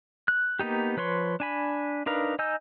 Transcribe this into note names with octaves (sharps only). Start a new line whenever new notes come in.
F#6
A#3 B3 D#4 G4
F3 B4 C#5 C6
D4 G#5 B5
D4 D#4 A#4 B4 F5
D#4 D#5 G#5 E6 G6